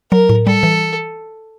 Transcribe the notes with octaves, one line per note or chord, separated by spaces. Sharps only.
F#3 A#4
A2
G3 A4
E3